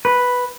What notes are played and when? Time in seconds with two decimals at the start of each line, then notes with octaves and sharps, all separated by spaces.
0.05 B4